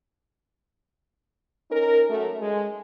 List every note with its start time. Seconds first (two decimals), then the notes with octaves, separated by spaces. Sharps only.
1.71 C#4 D#4 A#4
2.09 F#2 A3
2.40 G#3